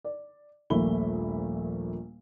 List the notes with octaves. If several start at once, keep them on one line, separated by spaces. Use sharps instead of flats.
D5
D#1 A#1 A#2 A3 B5 G7